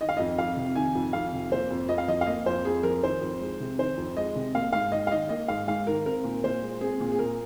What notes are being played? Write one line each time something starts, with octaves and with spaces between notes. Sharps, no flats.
D#3 D#5
F5
F2 D#5
F2 F5
C3
D#3 G#5
F2
F2 F5
C3
A#3 C5
F2
F2 D#5
F5
F3 D#5
F5
A#3 D#5
F2 C5
F2 G#4
F3 A#4
D#3 C5
F2
G#3
C3
D#3 C5
F2
G#3 D#5
C3
A#3 F5
G#2 F5
G#2 D#5
F5
D#3 D#5
A#3 D#5
G#2 F5
G#2 F5
D#3 A#4
C4 A#4
A#2
A#2 C5
G#3
C4 G#4
A#2
G#4
A#2 A#4